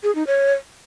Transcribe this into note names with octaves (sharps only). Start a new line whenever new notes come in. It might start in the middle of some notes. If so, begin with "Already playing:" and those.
G#4
D#4
C#5